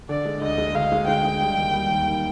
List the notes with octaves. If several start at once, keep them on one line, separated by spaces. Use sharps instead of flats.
D3 D5
G#3
D2 D#5
G#3
D2 F5
G#3
G#3 G5
G#3
G3
D#2
G3
D#2
D#3